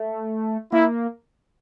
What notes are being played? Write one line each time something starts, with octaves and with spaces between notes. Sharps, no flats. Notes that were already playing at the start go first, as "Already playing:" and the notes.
Already playing: A3
A#3 E4